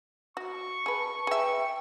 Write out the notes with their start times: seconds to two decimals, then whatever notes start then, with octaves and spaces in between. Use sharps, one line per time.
0.37 F#4 C#6
0.86 G#4 B4 A5
1.27 G#4 B4 E5 G5